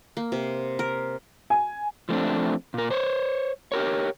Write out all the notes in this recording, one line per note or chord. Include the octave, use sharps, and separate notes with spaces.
A#3
C3
A#4
G#5
F3 A3 C4 D4
A#2 A#4
C5 C#5
G4 A#4 C#5